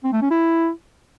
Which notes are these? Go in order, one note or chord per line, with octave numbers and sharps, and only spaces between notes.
C4
A3
C#4
E4